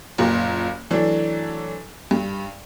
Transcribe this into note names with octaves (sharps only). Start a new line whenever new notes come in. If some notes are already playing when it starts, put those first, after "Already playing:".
F#1 A#2 A#4
E3 F#3 A3 D4
G2